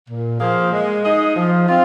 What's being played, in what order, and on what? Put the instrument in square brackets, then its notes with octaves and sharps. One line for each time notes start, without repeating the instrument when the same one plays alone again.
[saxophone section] A#2
F3 A#3 G#4 C5
G#3
D#4 G#4 D#5
F3
C4 F4